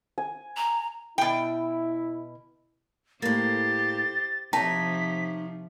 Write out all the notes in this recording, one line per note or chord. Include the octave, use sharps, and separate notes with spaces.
G#5
A#5
B2 E4 G5
A2 A#3 G4 C5 A6
C3 F3 D#4 C#5 A5 B6